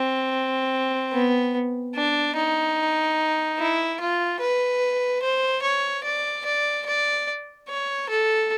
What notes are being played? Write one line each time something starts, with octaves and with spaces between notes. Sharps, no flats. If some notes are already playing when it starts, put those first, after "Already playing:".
Already playing: C4
B3
D4
D#4
E4
F4
B4
C5
C#5
D5
D5
D5
C#5
A4